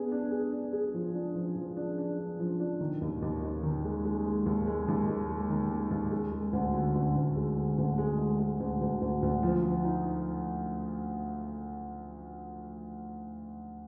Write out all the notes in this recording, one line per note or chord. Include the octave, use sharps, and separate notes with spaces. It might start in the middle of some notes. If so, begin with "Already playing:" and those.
Already playing: B3 D4 G#4
D4
G#4
D4
G#4
F3
D4
F3
F3
D4
D4
D4
F3
D4
D#3
D#2
D#2
D#2
D#3
G#3
G#3
G#3
D#2
G#3
D#2
G#3
G#3
D#3
G#3
D#2
G#3
G#3
D2
D3
D2
D2
G#3
D3
D2
G#3
G#3
G#3
D2
D2
D2
D2
F3
F3
D#4